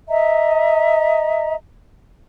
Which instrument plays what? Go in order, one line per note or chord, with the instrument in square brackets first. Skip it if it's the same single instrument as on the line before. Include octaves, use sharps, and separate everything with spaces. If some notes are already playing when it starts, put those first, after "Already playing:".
[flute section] D#5 E5 A#5